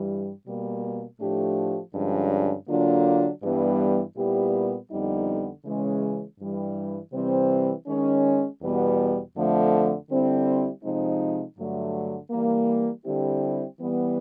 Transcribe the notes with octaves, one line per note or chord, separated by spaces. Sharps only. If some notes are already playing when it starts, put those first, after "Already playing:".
Already playing: G2 E3 G3
B2 G3 A#3
A2 F3 A3 D4 G4
G2 D3 F3 G#3 C#4
D3 F#3 A#3 D4 F4
G2 E3 G3 B3
A#2 G3 B3 E4 G4
F2 D3 G3 B3 D#4
C#3 E3 G#3 C#4
G2 E3 G3
C3 E3 G3 C4
D#3 G#3 C#4
E2 B2 G3 B3
F2 D3 F3 A3
D3 G3 C4 E4
C3 F3 G#3 C4 D#4
G2 D3 F#3 A3
E3 G3 A#3
D3 G3 C4 E4 G4
E3 G3 B3